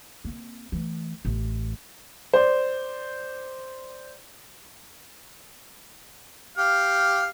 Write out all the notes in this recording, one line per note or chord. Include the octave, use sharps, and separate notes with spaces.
A#3 C4
E3 A3
A1
C5 D5
G4 F5